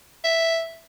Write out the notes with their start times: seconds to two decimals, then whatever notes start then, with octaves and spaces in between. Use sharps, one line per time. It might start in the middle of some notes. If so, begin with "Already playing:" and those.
0.24 E5